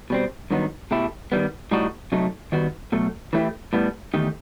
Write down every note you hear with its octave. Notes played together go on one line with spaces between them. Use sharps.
B2 G3 C4
G2 D#3 F#3 B3 D#4
B2 A3 E4 G4
D#3 G3 B3
A2 G3 D#4 F#4
C3 F#3 A3 D#4
D#3 G3 B3 F#4
B2 F#3 A3
E3 A3 C4 E4 G4
A2 G3 B3
E2 D#3 A3 D#4 G4